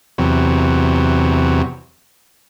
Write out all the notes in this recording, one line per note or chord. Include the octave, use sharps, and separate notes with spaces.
E2 C3 F#3